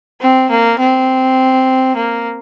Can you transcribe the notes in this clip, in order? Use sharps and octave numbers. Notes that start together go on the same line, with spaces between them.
C4
A#3
C4
A#3